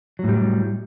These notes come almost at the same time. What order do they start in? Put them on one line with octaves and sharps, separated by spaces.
F#3 A2 G3